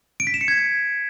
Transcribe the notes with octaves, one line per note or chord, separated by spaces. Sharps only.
D7
B6
E7
C#7
G#6